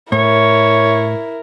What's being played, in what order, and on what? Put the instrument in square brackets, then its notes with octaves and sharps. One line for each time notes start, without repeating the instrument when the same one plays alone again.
[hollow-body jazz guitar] A2 [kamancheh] E4 A#4 [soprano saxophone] C#5